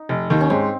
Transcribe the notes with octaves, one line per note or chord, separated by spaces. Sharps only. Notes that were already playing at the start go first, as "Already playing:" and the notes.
Already playing: D#4
F1
D#2 D#3
C#4
G#2 C4